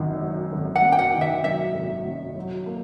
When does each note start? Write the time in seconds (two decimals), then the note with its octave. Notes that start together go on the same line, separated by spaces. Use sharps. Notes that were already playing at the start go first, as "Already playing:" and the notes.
Already playing: G#1 F#2 D#3
0.22 F#3
0.53 G#1
0.76 F#5
0.82 F#2
0.92 G5
0.99 F#5
1.14 D#3
1.21 E5
1.44 F#3 E5
1.75 G#1
2.05 F#2
2.36 F#3
2.66 A#3